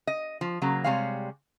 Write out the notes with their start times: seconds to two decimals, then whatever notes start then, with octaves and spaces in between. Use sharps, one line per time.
0.07 D#5
0.41 F3
0.62 C#3 F#3 A#3
0.84 C3 G3 G#3 C#5 F5